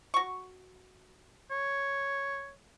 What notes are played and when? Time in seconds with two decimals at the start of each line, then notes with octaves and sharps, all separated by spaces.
0.14 F#4 C#6
1.51 C#5